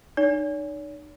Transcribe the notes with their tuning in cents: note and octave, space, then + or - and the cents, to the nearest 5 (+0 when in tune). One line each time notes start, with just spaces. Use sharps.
D#4 -35 C#5 +45